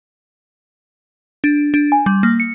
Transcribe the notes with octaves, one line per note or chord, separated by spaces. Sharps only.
D4
D4
G#5
G3
A#3
C#7